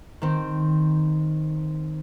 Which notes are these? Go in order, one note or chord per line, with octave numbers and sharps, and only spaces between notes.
D#3 C4